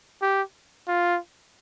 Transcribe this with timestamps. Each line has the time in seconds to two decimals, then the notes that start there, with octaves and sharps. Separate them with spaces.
0.22 G4
0.88 F4